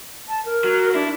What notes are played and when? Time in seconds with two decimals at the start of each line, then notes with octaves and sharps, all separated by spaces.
0.28 A5
0.45 A#4
0.64 F#3
0.95 D4 E4